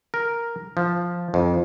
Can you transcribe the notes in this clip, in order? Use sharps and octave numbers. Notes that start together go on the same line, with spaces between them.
A#4
F3
F2